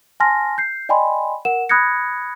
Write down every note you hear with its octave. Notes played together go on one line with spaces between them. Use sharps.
G#5 A5 C6 F6 A#6
G6 C7
D5 D#5 G5 G#5 B5 C6
A#4 F#5 E7
B5 D#6 F#6 G#6 A#6 C#7